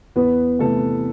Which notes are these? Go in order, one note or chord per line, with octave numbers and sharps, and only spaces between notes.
E2 B3 B4
C3 E3 A3 A4